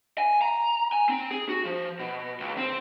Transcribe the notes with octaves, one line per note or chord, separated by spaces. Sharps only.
G#5
A#5
G#5
C4
G#4
F#4
F3
B2
C#2
C4